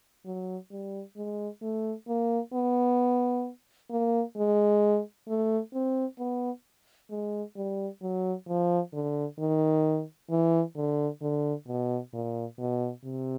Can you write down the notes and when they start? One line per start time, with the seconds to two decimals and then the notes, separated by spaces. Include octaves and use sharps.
0.25 F#3
0.71 G3
1.17 G#3
1.62 A3
2.08 A#3
2.53 B3
3.91 A#3
4.36 G#3
5.28 A3
5.73 C4
6.19 B3
7.10 G#3
7.56 G3
8.02 F#3
8.48 F3
8.93 D3
9.39 D#3
10.30 E3
10.76 D3
11.22 D3
11.67 B2
12.13 A#2
12.59 B2
13.05 C3